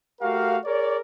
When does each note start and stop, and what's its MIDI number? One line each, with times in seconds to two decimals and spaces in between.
0.22 0.57 57
0.22 0.57 66
0.22 0.57 67
0.22 0.57 70
0.22 0.57 77
0.65 0.97 68
0.65 0.97 70
0.65 0.97 73
0.65 0.97 74